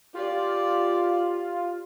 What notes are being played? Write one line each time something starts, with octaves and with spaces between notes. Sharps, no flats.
F4 G4 D5